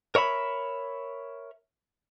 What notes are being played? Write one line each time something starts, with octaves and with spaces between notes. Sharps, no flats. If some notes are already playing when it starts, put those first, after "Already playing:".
A#4 C#5 E5 B5